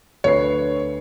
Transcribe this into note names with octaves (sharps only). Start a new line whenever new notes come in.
D2 B4 C#5 C7